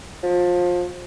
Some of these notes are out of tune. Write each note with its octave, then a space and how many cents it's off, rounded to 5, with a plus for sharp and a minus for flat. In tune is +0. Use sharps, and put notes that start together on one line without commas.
F3 +25